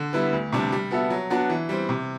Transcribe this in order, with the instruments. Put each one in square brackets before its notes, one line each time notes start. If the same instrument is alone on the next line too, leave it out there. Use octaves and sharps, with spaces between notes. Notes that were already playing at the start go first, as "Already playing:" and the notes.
Already playing: [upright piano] D3
G3 B3 E4 B4
D2
C3 G3 D4
G3
B3 F#4 A4 E5
F#3
B3 D4 F#4 B4
E3
G3 C4
C3